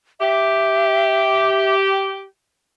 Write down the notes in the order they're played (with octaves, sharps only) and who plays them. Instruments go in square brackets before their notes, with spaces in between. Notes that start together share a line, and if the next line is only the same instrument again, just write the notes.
[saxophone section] G4 [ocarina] E5